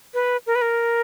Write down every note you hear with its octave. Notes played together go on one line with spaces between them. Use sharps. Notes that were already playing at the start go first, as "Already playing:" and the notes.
B4
A#4
B4
A#4